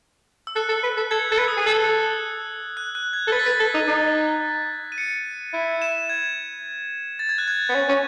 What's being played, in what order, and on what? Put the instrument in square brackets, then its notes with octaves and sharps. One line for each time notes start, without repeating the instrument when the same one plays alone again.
[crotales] E6
[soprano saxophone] A4 [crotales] F#6
[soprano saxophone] A4
B4
A4
[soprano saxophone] A4 [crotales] G#6
[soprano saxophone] A4 [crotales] F#6
[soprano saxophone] B4
[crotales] D#6
[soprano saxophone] G#4
[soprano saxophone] A4 [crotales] E6
[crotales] F#6
E6
F#6
F#6
G#6
[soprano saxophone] A4
[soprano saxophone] B4 [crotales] A6
[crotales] B6
[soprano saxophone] B4 [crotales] A6
[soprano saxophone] A4
D#4
D#4
[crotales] D#7
C#7
[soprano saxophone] E4
[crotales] E7
G#6
A6
G#6
F#6
G#6
[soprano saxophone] B3
C#4
C#4